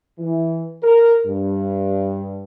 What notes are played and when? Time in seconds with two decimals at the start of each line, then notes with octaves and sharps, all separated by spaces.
0.18 E3
0.82 A#4
1.26 G2